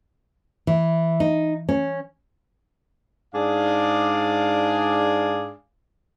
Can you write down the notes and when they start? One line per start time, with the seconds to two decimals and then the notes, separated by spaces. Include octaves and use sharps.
0.67 E3
1.20 D#4
1.69 C#4
3.34 G#2 D4 G#4 D5 F5